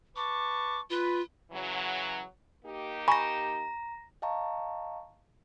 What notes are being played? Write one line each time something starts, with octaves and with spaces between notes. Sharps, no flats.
B4 A5 C#6 D6
F4 B4
C#3 E3 F#3
A#3 D#4 G4
G#5 A#5 B5 C#6 A#6
D#5 F5 G5 A5 A#5 C#6